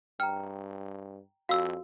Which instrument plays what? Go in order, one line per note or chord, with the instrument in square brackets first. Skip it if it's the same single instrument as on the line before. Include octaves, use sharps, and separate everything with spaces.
[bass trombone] G2 [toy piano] G5 A#5 [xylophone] F6
[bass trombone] F2 [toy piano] F#4 [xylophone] F5 E6